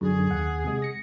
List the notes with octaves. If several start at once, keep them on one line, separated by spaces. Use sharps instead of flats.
F#2 D3 G#4
D#2 F#5
C3 G#3
A#6 C#7